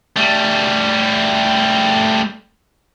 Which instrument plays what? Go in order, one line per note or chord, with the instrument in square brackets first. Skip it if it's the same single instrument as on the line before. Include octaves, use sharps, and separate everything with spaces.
[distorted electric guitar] G3 A3